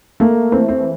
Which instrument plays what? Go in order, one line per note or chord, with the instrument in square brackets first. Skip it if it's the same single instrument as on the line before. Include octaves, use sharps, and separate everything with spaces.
[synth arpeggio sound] A3 [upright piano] A#3
[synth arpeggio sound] E3 [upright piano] C4
[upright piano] C4